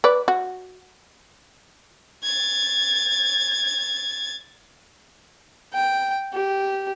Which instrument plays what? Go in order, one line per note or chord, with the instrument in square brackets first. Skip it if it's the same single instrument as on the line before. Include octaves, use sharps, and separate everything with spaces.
[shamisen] B4 D5
F#4
[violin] G#6 A6
[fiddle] G5
G4